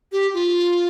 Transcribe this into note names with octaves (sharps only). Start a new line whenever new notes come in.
G4
F4